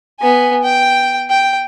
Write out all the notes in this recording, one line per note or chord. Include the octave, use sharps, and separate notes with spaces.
B3 G#5
G5
G5